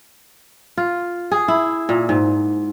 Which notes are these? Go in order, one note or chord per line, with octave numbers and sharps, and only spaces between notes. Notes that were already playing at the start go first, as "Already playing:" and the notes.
F4
G#4
E4
A#2
G#2